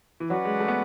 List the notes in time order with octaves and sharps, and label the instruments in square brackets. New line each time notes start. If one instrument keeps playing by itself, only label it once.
[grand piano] E3
[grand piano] F#3 [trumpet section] C#4 F#4 B4 D5 F#5
[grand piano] G#3
A3
B3